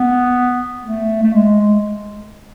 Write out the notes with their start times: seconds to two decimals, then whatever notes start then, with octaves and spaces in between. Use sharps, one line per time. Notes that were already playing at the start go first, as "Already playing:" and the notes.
Already playing: B3
0.84 A3
1.23 A3
1.34 G#3